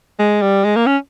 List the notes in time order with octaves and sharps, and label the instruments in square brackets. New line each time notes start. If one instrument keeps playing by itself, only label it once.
[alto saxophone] G#3
G3
G#3
A#3
C#4